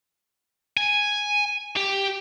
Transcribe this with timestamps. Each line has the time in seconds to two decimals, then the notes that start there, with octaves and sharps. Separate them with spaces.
0.77 G#5
1.76 G4